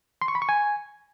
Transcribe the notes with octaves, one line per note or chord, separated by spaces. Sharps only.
C6
C#6
B5
C#6
G#5